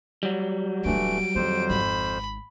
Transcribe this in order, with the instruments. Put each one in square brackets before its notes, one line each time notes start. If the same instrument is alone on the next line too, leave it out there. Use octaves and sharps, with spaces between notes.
[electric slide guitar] F#3 G3
[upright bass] D#1 D4 [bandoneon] E3 A3 [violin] D7
[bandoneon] F2 C5 [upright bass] D#3
[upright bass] G#1 [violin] B5